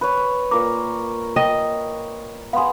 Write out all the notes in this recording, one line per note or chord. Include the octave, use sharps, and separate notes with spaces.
B4 C#5
A#2 A#4 D6
D#5 G5
B3 G#4 F5 C6